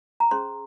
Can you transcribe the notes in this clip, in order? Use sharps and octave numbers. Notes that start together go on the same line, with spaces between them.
A#5
C#4 G#4 C5 C6